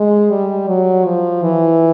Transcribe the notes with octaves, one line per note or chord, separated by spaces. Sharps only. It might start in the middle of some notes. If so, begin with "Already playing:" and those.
Already playing: G#3
G3
F#3
F3
E3